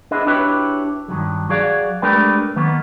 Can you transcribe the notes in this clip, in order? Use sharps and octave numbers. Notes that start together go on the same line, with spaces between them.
D4 E4 G#4 D#5
D4 E4 F#4 G4 B4 C#5
G2 B2 D#3 F#3
F#3 F#4 G#4 D5 F5
G#3 A3 D4 G4 A#4 B4
D#3 F#3 A#3 B3